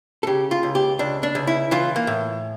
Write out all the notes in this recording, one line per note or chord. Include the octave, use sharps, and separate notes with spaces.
A4
C#3 G4
F4
C#2
G4
C#2 D4
D4
C#2
E4
E3 F4
A#3
A2